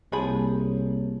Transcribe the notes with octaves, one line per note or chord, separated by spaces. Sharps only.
C2 F3 A#3 G4 G#4 C#5 B5